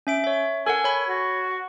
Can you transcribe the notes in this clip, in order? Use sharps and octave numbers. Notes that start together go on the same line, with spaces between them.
C#4 E5 D7
C#5 E5
A4 A#4 F#5 G#5
C#5 B5
F#4